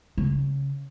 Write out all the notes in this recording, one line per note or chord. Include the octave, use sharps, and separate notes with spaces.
C#3